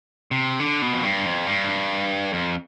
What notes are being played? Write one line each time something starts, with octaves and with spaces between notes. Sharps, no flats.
C3
D3
B2
F2
G2
F2
G2
F2